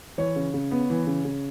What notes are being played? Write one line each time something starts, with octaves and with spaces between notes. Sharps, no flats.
E3 C#5
C#3
C#3
B3
E3
C#3
C#3